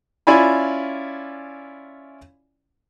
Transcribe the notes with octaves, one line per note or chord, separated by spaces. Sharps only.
C#4 E4 F4 D5 G#5 B5